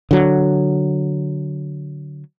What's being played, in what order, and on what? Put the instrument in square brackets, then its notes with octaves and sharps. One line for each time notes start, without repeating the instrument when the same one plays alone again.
[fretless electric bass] D3 F#3